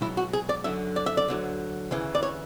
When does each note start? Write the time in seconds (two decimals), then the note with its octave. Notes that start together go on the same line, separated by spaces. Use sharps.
0.01 C#2 B2 F#3 E4
0.17 F#4
0.33 G#4
0.49 D5
0.64 F#2 D3 F#3 E5
0.96 D5
1.06 E5
1.17 D5
1.28 D2 D3 F#3
1.91 D2 C#3 E3
2.15 D5
2.23 C#5